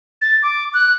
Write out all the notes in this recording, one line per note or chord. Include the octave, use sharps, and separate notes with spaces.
A6
D6
F#6